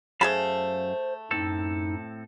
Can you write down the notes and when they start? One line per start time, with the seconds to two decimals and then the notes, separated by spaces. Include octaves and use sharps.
0.21 F#2 A3 G#4 C5 F5 A5 B5
1.31 F#2 A2 C4 D#4 A4